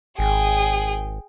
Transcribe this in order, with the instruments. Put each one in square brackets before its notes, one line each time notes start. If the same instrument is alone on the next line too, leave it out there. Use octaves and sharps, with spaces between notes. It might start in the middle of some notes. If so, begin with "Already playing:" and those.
[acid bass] G#1 [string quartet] G#4 G5